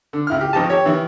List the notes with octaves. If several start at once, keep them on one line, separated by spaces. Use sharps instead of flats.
D3
C#2 E4 F6
G4
G#1 F3 D#4 G4 A5
G4 C#5
D#3 E3